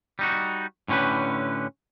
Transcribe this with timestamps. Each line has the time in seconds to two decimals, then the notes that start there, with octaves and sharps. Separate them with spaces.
0.19 G3 D#4 F#4
0.88 A2 D3 C#4 G4 B4